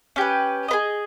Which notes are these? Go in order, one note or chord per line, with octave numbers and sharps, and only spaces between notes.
C#4 G4 B4
G#4 B4 D#5